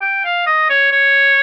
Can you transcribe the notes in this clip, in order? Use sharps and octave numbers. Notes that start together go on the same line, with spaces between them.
G5
F5
D#5
C#5
C#5